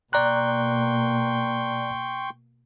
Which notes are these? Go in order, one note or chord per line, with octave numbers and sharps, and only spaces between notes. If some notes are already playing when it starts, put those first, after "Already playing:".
B2 A#3 D5 G5 A#5 C6 C#6 F#6